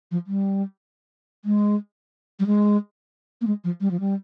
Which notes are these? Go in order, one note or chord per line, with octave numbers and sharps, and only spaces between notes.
F3
G3
G#3
G3
G#3
A#3
G#3
F3
G3
F3
G3